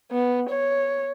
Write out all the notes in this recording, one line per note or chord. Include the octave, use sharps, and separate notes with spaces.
B3
C#5